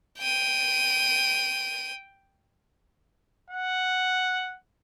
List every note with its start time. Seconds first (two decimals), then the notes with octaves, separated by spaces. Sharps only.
0.19 G5 D#7
3.50 F#5